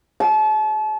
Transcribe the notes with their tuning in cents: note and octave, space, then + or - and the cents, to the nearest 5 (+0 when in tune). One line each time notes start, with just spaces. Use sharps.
A5 -35